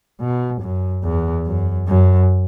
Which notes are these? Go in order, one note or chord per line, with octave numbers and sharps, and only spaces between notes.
B2
F#2
E2
F#2
F#2